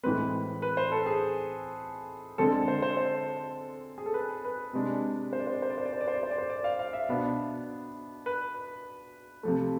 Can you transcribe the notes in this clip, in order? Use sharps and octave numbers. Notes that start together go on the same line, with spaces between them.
A2 E3 G#3 C4 B4
B4
C5
A4
G#4
D3 G#3 C4 A4
C5
C5
C5
G#4
A4
B4
B4
C3 G#3 D4
C5
D5
C5
D5
C5
D5
C5
D5
C5
D5
C5
D5
C5
D5
C5
D5
F5
F5
E5
B2 B3 D4
B4
C3 F3 A3